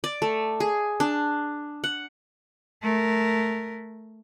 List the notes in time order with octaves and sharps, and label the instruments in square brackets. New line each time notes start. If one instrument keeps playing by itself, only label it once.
[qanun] D5
A3
G#4
D4
F#5
[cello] A3 A#4